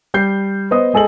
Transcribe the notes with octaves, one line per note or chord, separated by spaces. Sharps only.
G3 G6 C7
B3 C5 D#5 D#6
G#3 G#4 A4 D#5 F#7